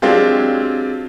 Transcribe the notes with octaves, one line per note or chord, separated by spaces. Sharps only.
F#3 G#3 C4 D4 F4 G4